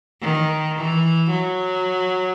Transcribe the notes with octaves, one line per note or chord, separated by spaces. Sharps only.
D#3
E3
F#3